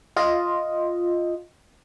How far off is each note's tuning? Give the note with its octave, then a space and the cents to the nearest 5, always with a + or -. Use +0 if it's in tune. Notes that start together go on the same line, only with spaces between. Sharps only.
F4 +0 D#5 +0